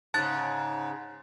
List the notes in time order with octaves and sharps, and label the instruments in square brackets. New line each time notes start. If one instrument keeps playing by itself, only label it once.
[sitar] G#2 C#3 [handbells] A5 F#6 A6